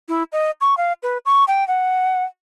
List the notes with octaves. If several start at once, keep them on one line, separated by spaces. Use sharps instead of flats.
E4
D#5
C#6
F5
B4
C#6
G5
F#5